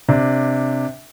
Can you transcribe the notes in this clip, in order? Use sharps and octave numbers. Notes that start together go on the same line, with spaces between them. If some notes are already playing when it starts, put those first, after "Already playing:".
C3 D4